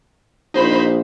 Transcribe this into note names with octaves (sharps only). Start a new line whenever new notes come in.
A#1 D#4 C5 B5